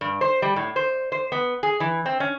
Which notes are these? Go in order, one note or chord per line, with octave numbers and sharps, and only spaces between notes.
G2
C5
G3
A2
C5
C5
B3
G#4
E3
C4
C#4